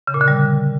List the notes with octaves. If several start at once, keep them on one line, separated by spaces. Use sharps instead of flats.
C#3
A#2
D3
G3